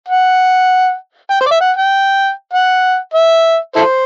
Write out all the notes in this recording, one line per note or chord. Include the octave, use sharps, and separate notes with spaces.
F#5
G5
C5
D5
E5
F#5
G5
F#5
E5
E4 A4 C5